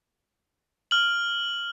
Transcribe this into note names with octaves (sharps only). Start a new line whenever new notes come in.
F6 F#7